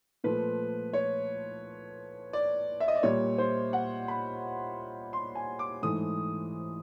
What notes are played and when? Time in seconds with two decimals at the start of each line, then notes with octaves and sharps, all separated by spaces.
0.24 A#2 F3 A3 B4
0.93 C#5
2.33 D5
2.80 E5
2.88 D#5
2.96 D5
3.03 A#2 G3 C#5
3.38 C5
3.73 F#5
4.08 B5
5.13 C6
5.35 G#5
5.59 D6
5.82 G#2 E3 A3 D#6